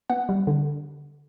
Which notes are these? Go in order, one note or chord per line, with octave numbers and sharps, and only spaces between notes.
B3 F#5
G3
D3